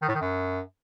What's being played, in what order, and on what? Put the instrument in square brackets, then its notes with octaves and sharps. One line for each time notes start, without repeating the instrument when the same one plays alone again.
[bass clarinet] D#3
A2
D#3
F#2